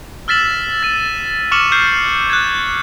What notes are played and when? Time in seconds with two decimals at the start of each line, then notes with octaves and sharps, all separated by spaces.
0.28 E6 F6 A6 B6 E7 F#7
0.83 A6 D#7
1.51 C#6 D6 F6 C#7 E7 F#7
1.72 C#6 F6 G6 C7
2.30 F#6 G#6